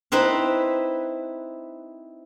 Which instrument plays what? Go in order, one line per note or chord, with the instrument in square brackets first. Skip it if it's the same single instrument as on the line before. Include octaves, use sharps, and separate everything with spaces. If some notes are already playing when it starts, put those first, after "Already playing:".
[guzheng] C4 D#4 E4 B4